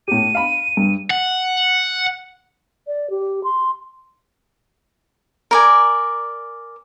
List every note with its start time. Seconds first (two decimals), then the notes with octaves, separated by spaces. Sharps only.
0.08 A2 G4 D#7
0.35 F5 B5
0.77 G2
1.10 F#5
2.87 D5
3.10 G4
3.44 C6
5.51 A#4 D5 G#5